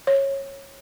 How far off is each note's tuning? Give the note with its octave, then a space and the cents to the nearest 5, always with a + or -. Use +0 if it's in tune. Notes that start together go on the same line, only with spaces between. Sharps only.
C#5 -20